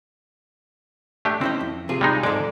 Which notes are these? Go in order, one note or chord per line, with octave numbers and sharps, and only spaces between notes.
A3 D4 G4
C4 C#4 E4 D#5
F2
C3 F4 G#4
G3 G#3 D#4
G#2 G#3 A4 D5